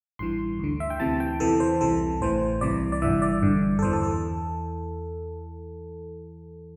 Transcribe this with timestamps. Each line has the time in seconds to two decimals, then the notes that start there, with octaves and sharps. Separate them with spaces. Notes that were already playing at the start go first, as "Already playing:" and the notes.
0.19 A1 G2 E3 C6
0.59 D2 D3
0.80 E5
0.90 G5
1.00 D2 C3 E3 A5
1.20 G5
1.40 E2 C3 E3 A4
1.60 C5
1.81 C2 C3 E3 A4
2.21 A1 A2 E3 C5
2.61 C2 C3 E3 D5
2.92 D5
3.02 G1 G2 E3 E5
3.22 D5
3.42 G1 G2 D3
3.79 A4
3.82 E2 E3 C5
3.93 A4
4.03 A4